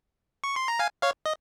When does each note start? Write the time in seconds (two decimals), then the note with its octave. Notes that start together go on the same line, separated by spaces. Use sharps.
0.44 C#6
0.56 C6
0.68 A#5
0.79 F5 G#5
1.02 C#5 F5
1.26 D#5